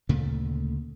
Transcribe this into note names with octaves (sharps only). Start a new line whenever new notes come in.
D2 A#2 C#3 A3